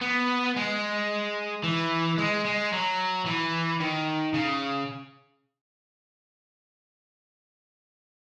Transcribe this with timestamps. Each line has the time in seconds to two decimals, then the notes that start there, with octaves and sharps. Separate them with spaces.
0.01 B3
0.56 G#3
1.64 E3
2.18 G#3
2.45 G#3
2.72 F#3
3.26 E3
3.80 D#3
4.34 C#3